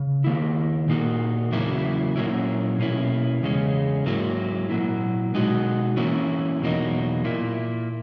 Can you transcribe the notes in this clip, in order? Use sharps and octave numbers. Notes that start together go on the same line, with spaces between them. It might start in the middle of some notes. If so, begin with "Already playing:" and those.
Already playing: C#3
D#3 A#3 E4
A#2 A#3 D#4 F#4
E2 C#3 F#3 A#3 E4
A#2 F#3 A#3 C#4 E4
B2 A#3 C#4 E4
E2 C#3 G#3 C#4
G#2 F#3 A#3 E4
A#2 F#3 A#3 E4
B2 G#3 D#4 F#4
E3 A#3 C#4 E4
E2 B2 F#3 A#3 D#4
A#2 A#3 E4